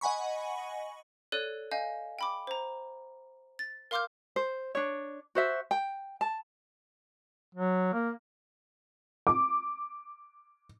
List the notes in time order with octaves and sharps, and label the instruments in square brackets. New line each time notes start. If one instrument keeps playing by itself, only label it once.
[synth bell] D#5 F#5 G#5 B5 C#6
[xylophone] A4 C#5 D5 F#6 D#7
D#5 F5 G#5 G6
G5 B5 D6
C5 A#5
A6
A#4 F5 C6 D6 F6 G6
[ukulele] C5
D4 C#5
F#4 C5 E5
G5
A5
[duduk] F#3
A#3
[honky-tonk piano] D6